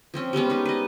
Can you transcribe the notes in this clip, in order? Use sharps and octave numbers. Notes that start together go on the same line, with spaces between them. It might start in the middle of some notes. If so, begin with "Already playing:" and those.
F3 C4 C#4
G3 G#3 B3 C#4
B3 D#4 B4
B4 D#5